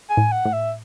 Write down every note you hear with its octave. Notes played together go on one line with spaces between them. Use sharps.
G#5
A2
F#5
A2
E5